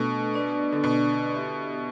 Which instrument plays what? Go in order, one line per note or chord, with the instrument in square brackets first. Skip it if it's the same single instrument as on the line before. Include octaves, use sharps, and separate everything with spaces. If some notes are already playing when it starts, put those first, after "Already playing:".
Already playing: [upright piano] B2 [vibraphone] A3 D4 A4
[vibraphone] D4 B4 D5
[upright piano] D3
B2
[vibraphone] B3 E4 G4 E5